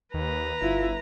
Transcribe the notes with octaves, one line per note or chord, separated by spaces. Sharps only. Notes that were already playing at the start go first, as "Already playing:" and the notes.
D#2 B4 A#5
G1 E4 F4